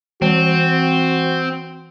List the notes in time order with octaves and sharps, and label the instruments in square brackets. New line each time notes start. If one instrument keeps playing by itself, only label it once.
[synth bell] E3 [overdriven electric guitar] C4 [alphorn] F#4